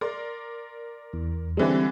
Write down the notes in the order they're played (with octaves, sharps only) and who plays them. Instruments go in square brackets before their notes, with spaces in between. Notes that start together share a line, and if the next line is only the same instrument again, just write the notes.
[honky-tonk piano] A#4 D5 C6
[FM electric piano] E2
[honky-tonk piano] D3 E3 G#3 [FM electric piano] G3 C4